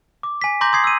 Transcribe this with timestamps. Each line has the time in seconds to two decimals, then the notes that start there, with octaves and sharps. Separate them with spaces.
0.23 D6
0.42 G#5 B6
0.61 A#5 C6 D6 G6 A#6 F#7
0.73 C6 D#6 G#6 C7
0.84 E6 D#7